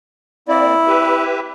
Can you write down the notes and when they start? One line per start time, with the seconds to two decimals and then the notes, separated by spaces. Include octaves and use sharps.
0.48 A#3 C4 E4 D5
0.87 G4 B4 E5